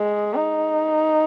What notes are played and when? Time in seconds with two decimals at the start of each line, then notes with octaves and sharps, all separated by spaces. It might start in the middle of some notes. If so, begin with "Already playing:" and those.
Already playing: G#3
0.35 D#4